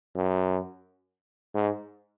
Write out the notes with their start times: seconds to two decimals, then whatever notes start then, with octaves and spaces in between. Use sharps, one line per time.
0.16 F#2
1.55 G#2